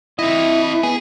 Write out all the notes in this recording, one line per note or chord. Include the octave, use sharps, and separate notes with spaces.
C4 E4 D#5
B3 G#4